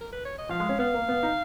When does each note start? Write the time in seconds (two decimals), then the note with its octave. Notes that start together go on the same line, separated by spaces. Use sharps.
0.01 A#4
0.13 B4
0.25 C#5
0.38 D#5
0.49 F3 F5
0.60 G#3
0.69 C#4
0.79 B3 F5
0.94 A#3
1.08 B3
1.23 D#4